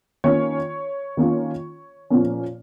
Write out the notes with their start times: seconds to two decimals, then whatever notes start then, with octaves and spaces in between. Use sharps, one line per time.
0.24 D#3 A#3 C#4 F4 C#5
1.17 D#3 A#3 C#4 F4
2.10 A#2 F3 A#3 C#4